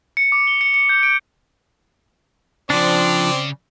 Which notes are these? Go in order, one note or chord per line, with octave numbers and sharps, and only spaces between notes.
C#7
D6
G7
C#7
C#7
G6
D7
C#3 F3 C4 D4 D5